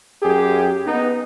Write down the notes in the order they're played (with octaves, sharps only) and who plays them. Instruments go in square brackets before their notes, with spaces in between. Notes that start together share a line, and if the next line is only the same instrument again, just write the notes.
[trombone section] F#2 G4 G#4
B3 D#4